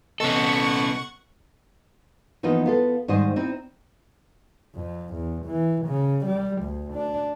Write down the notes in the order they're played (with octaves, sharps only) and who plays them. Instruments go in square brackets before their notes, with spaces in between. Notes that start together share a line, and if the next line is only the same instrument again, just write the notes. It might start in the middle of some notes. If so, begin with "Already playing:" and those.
[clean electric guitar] C2 B3 D#5 [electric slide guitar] C#4 A4 [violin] F#5 C#6
[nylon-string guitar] E3 F3 A#3 B3 D#4 F4
B3 F4 A4
G#2 D#3 G3 C5 D#5
C4 D#4 E4
[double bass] F2
E2
E3
C#3
G3
D2
D4